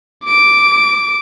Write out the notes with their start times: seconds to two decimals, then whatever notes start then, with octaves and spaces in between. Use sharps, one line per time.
0.25 D6 D7